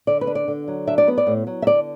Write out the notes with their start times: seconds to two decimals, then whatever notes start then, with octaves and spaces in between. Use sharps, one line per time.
0.07 D3 D5
0.21 B4
0.27 D4
0.35 D5
0.48 D3
0.68 F#3
0.87 D4 E5
0.98 D5
1.08 B3 B4
1.18 D5
1.27 A2
1.47 F#3
1.62 E5
1.67 D3 D5